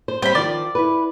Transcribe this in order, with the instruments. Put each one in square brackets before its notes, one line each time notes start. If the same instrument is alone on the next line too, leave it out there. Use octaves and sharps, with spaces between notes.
[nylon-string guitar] C5
[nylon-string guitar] G3 C4 C#4 [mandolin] C5 B5
[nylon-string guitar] D#3 F3 F4 [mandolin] D5
[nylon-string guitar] E4 B4